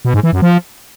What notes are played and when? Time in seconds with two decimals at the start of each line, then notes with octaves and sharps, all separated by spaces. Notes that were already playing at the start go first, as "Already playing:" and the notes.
0.05 B2
0.14 G#2
0.23 E3
0.33 F#2
0.42 F3